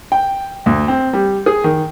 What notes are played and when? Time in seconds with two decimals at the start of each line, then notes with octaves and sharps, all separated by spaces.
0.12 G5
0.66 D2
0.88 C4
1.13 G3
1.46 G#4
1.64 D#3